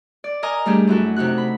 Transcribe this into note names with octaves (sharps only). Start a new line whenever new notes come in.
D5
A#4 D#5 G#5 A#5 D#6
G3 A3 D4 G4 G#4
F#2 E4 F#4 A4
C3 D#4 F#4 F#6
B5